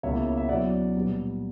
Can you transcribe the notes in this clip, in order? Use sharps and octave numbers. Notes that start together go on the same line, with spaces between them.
C#2 B2 A#3 E4 C#5 E5
E5
B2 F#3 C#4 E4 D5 F#5
A#2 G3 B3